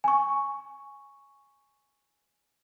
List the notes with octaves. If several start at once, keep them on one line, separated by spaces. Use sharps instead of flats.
G#5 C#6